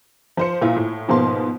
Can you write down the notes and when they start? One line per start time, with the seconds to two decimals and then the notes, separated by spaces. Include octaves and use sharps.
0.37 F3 C5 C#7
0.62 A#2 E4 F4
0.77 A2
1.08 G#2 B2 F3 A#3 C6